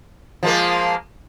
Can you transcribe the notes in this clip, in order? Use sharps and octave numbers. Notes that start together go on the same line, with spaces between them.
F3 G#3 A#3